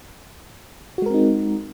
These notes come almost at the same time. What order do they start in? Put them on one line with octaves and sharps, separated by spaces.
F#4 G#3 A#4 C4 D#4